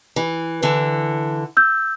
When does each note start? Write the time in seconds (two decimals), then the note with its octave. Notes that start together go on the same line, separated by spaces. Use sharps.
0.16 E3
0.63 D3 E3
1.57 E6 G6